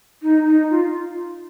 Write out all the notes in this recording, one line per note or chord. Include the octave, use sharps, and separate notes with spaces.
D#4
D#4
F4